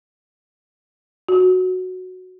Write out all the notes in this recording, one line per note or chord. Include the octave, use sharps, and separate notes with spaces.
F#4